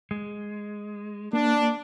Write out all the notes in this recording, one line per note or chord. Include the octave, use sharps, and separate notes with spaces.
G#3
A#3 D4